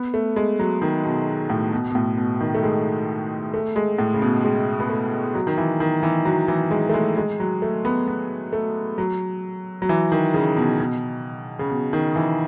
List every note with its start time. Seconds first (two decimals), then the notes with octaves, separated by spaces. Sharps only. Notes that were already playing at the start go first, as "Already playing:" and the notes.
Already playing: B3
0.14 A3
0.36 G#3
0.59 F#3
0.82 D#3
1.05 B2
1.50 A2
1.72 B2
1.91 B2
1.95 A2
2.17 B2
2.40 D#3
2.54 A3
2.63 G#3
3.54 A3
3.76 G#3
3.98 A2
4.14 C#3
4.22 B2
4.44 G#3
4.80 B3
4.90 A3
5.35 F#3
5.47 D#3
5.58 E3
5.80 D#3
6.03 E3
6.25 F#3
6.48 E3
6.71 G#3
6.89 A3
6.94 G#3
7.17 G#3
7.40 F#3
7.62 A3
7.85 B3
8.08 B3
8.53 A3
8.98 F#3
9.82 F#3
9.89 E3
10.12 D#3
10.34 C#3
10.57 B2
10.79 B2
11.59 C#3
11.70 B2
11.93 D#3
12.16 E3